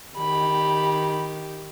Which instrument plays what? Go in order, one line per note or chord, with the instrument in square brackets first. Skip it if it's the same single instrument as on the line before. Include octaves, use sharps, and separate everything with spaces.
[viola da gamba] D#3 G4 [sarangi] B5